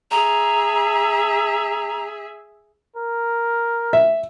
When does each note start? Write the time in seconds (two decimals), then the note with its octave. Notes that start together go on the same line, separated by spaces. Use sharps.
0.11 G#4 E5 A#5
2.97 A#4
3.93 E5